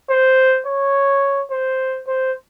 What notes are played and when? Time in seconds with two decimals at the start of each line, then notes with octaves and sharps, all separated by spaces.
0.10 C5
0.66 C#5
1.51 C5
2.07 C5